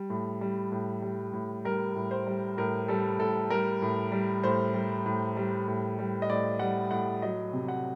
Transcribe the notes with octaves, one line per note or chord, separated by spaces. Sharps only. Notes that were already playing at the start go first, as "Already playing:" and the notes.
Already playing: G3
A2
G3
A2
G3
A2
G3 A#4
A2
C5
G3
A2 A#4
G3 A4
A2 A4
G3 A#4
A2
G3
A2 C5
G3
A2
G3
A2
G3
D#5
A2 D5
G3 F#5
A2 F#5
F#3 D#5
C3
F#5